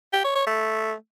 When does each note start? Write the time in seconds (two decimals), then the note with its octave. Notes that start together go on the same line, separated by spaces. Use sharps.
0.13 G4
0.24 C#5
0.36 C#5
0.47 A3